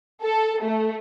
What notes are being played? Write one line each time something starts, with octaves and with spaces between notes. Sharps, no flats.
A4
A3